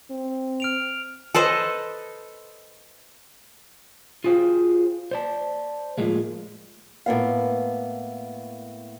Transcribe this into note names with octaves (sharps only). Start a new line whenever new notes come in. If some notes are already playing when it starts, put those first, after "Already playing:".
C4
F6 D7 F7
A4 B4 C5 D#5
F4 F#4 G#4 C5 F5 G5
C5 D5 A5
A2 F3 G#3 A#3
A2 A#3 B3 F5